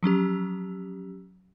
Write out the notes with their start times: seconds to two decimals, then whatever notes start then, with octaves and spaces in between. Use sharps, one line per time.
0.03 F3 F#3 C#4 G4